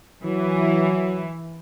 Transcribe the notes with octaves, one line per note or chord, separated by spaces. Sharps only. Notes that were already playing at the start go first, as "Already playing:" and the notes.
E3 F#3